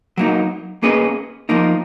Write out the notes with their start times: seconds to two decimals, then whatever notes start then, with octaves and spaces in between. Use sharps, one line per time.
0.17 F#3 A#3 D#4
0.83 A#3 C#4 G#4 B4 D#5
1.49 F3 A#3 D#4 A#4